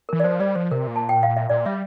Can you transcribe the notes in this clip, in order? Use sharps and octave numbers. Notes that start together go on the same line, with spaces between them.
E3 A#4
D5
F3 C5
G3 D5
F3 C5
C3 A#4
A#2
A5
G5
F5
E5
A#2 D5
G3 E5